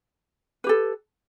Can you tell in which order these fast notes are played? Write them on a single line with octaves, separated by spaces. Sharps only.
B4 G4 A4